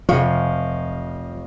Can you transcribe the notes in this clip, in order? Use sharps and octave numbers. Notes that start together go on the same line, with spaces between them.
F1 F3 D#5 F5 C#6